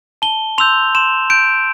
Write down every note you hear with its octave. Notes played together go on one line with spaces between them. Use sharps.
A5 G7
C6 E6 G6 F7
C6 E7
G6 D7